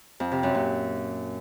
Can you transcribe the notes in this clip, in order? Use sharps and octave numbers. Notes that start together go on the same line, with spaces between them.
F2
C3
F#2
A#2